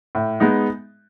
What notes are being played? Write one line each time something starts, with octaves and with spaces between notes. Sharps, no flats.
A2
G#3 B3 D#4